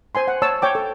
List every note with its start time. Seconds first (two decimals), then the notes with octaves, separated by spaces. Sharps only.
0.15 C5 G#5 C6
0.28 F#5
0.42 C#5 A5 E6
0.62 C#5 G5 D6
0.75 A4